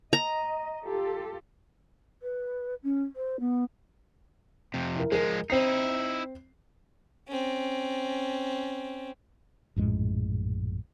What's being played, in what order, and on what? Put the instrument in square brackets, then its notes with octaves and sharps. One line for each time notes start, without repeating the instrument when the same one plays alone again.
[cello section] D#5 [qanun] A#5
[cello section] F4 G4 A4
[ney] B4
C#4
C5
B3
[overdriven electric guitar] F2 C3
[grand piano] E4 A#4
[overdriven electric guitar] F3 G#3 [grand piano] G#4 A#4
[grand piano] C4 C7 [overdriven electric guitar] D#4 E4
[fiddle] C4 C#4
[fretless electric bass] A#1 F#2 A2 G#3